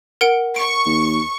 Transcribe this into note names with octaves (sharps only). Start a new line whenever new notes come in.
A#4 F#5 D7
C#6 D7
D#2